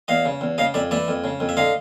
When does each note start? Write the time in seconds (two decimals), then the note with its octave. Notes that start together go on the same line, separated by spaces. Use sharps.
0.08 E2 D#5 F5
0.25 C#3
0.41 E2
0.58 C#3 D#5 F5
0.74 F2 D5 E5
0.91 E3 D5 E5
1.08 F2
1.24 C#3
1.40 F2
1.49 E5
1.57 D3 D#5 F5